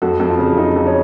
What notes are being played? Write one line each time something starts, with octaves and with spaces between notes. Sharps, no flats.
F2 F#4
F2
F4
C#3
F2 D#4
F2
C#4